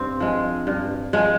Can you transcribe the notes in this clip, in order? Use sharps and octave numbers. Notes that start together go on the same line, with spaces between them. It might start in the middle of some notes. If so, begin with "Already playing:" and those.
Already playing: G2 C4
F3 G#3
G2
F3 G#3